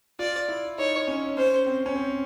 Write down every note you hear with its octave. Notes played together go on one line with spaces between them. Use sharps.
F4 D5
E4
D#4 C#5
C#4
C#4 C5
C4
C#4
C4